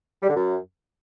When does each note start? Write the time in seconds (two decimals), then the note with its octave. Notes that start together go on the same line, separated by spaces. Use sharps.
0.22 G3
0.29 D3
0.36 F#2